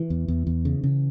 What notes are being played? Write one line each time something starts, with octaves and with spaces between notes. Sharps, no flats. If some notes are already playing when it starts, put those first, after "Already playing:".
Already playing: E3
E2
E2
E2
C#3
C#3